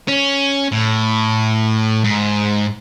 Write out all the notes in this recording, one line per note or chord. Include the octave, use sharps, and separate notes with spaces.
C#4
A2
G#2